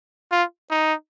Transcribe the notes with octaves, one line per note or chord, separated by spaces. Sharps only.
F4
D#4